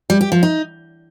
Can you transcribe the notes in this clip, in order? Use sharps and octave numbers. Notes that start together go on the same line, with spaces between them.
G3
G4
F3
D#4